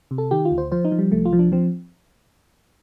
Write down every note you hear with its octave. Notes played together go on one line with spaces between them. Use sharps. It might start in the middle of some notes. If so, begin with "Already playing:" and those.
C3
A4
D#3 G4
F4
D2
C5
F3 C5
D#4
F3
G3
C2 A3
F4
F3
D4
F3 C4